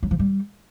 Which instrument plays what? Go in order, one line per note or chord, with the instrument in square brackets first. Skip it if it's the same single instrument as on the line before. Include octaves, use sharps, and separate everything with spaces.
[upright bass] F#3
F3
G3